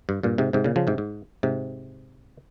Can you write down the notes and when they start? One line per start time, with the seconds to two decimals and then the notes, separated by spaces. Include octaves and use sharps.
0.09 G2
0.23 G2 A#2
0.38 G#2 C3
0.53 G#2 C3
0.64 A#2 C#3
0.76 C#3 F3
0.87 G#2 C3
0.98 G#2
1.43 G#2 C3